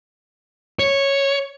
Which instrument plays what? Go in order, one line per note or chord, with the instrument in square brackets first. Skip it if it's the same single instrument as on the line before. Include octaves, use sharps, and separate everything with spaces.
[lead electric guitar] C#5